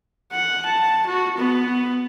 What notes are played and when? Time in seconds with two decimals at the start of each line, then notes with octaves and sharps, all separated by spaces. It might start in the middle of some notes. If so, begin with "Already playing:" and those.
0.33 F#5
0.66 A5
1.07 F#4
1.38 B3